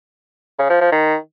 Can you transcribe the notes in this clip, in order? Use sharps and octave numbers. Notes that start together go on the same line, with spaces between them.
C#3
F3
F3
D#3